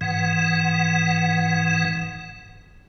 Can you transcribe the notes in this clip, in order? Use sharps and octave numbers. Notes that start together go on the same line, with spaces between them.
G#2 E3 F#5